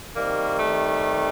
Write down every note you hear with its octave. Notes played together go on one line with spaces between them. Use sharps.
C3 D#3 G3 A#3
A3